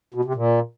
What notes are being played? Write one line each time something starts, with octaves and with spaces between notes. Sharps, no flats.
B2
C3
A#2